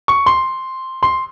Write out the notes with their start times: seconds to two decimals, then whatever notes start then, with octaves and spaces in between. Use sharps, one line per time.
0.08 C#6
0.26 C6
1.03 C6